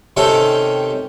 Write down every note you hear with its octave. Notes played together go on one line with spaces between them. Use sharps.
C3 D#3 C#4 G4 A4